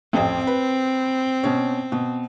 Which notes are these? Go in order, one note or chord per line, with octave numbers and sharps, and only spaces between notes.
A1 F2 C4
B4
B2 C#4
B2